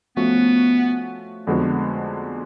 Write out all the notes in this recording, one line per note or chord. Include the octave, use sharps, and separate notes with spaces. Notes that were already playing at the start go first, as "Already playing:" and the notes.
F3 A3 B3 C#4 F#4
F2 D3 G#3 B3 F#4